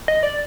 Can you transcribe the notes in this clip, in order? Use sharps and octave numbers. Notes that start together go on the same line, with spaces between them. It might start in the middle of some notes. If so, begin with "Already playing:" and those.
D#5
D5